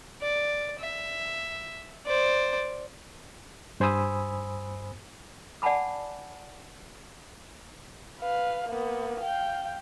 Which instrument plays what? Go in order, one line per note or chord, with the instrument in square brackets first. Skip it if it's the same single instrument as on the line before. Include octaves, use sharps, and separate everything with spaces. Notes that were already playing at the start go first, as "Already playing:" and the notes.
[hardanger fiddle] D5
E5
C5 D5
[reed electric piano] G2 C5 G#5 B5 D#6 E6
[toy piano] D5 F#5 G#5 A5 B5 D6
[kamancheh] B4 F5
A#3 B3
F5 G5